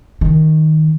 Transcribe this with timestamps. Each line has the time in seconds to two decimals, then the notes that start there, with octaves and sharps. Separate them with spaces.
0.21 D#3